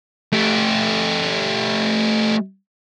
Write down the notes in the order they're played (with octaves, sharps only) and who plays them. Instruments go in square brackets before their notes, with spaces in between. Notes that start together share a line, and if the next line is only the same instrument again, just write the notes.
[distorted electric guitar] A3 G4